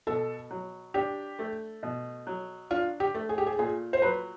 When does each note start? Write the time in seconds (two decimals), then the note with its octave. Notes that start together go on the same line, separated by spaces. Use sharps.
0.07 B2 A4
0.51 F#3
0.94 D4 G4
1.39 A3
1.83 B2
2.27 F#3
2.71 D4 F4
3.00 G4
3.14 A3
3.29 G#4
3.38 G4
3.47 G#4
3.59 A#2 G#4
3.93 C5
4.02 F#3 B4